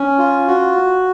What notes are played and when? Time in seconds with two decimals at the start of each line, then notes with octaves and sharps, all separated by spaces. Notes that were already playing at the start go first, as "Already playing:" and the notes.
Already playing: C#4
0.19 F4
0.47 F#4